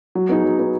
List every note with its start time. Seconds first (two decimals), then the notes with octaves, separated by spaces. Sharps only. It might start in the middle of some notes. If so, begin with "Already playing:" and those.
0.15 F#3
0.29 B3 D#4 G#4
0.44 F#3
0.59 B3 D#4 G#4